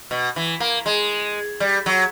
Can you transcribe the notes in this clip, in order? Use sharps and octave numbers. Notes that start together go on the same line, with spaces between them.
B2
E3
A#3
G#3
G3
F#3